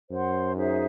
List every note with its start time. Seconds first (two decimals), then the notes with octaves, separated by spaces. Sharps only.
0.11 F#2 C5 F#5 C6
0.55 D#4 G#4 C5 E5